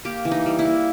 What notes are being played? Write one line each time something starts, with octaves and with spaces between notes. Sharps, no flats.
A#3 G4
E3
D#4
G3
E4
A#3